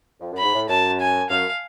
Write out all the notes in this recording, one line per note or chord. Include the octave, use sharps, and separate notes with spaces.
F2
F#2
G#2 B5
A2
F#2 A5
G#5
F#2 F5